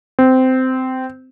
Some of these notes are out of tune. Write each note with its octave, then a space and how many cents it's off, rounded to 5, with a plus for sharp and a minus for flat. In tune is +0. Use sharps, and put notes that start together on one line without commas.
C4 -15